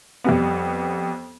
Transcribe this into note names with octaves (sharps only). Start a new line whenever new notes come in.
F2 G3 B3